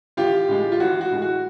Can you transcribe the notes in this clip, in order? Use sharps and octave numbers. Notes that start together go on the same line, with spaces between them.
A1 F4 G4
A2 E3 G#3
F4
A1 F#4
F#4
A2 E3 G#3
F#4